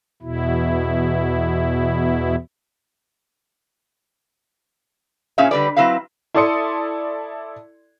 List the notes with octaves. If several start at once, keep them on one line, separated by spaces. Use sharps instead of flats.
E2 B2 E4
A#2 C#4 G#4 C#5 E5 F5
D3 G3 B4 D5
F#3 C4 E4 B4 F5
E4 A4 D5 C6 D#6 C#7